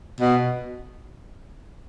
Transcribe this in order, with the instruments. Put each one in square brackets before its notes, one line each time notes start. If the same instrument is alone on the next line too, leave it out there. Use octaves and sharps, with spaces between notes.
[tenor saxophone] B2